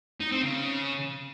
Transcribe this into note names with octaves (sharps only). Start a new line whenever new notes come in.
D#4
C4
C#3